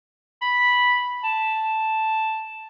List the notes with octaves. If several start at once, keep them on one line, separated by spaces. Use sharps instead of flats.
B5
A5